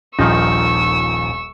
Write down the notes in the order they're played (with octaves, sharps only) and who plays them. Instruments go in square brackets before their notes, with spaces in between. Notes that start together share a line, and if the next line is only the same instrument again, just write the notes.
[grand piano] D#1 A#1 [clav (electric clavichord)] D#3 F3 D#4 [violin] C#6 E6